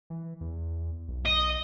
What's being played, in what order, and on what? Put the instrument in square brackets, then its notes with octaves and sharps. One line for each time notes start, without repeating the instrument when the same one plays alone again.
[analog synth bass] E3
E2
B1
[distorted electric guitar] D#5